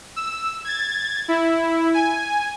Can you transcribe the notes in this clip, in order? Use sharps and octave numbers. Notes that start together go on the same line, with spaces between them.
E6
G#6 A6
E4
G#5